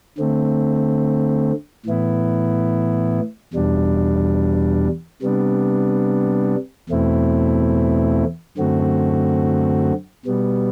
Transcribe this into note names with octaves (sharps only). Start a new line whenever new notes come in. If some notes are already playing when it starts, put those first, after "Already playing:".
D3 A3 C4
A2 E3 B3 E4
E2 B2 G3 D4
C3 G3 B3 D4
E2 B2 A3 C4 E4
F#2 D3 A3 C4 F#4
B2 G3 B3